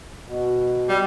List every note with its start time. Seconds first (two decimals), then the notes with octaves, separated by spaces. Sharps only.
0.27 B2
0.89 G3